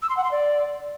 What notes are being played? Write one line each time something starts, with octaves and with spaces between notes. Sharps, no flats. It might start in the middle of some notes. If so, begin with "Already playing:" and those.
E6
C6
F#5
C6
D5